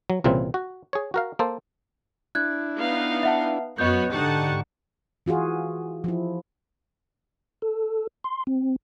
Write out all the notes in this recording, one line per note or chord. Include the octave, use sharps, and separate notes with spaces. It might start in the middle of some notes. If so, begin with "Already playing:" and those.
F#3
C2 A#2 C#3 E3 C4
F#4
G#4 C#5
F#4 A#4 F5
A#3 A4 C5
D4 E4 F#6 G#6
B3 D#4 F5
E5 F#5 A5
F#2 B3 F#4 C#5 D#5 G6
G#2 D3 D#4 G4 F#5 A5 C#6
E3 F4 F#4 G#4
F3 E4
A4
C6
C4